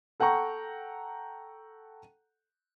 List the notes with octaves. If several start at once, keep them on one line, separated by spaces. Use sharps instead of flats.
A4 F#5 G5 A#5 C#6